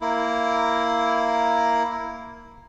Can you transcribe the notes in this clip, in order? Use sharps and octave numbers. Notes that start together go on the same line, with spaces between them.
A#3 E4